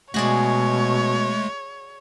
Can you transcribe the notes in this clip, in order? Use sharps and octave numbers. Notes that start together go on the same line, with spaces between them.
B2 G#3 A3 F#4 G#4 C#5 D5